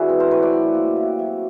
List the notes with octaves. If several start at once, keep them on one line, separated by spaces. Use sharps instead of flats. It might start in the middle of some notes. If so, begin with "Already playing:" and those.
Already playing: E3 D4 E4 F#4 G#4
C4
A#4 C5
A2 B4 C#5
D5 E5
F#3
A#3
C3
F#3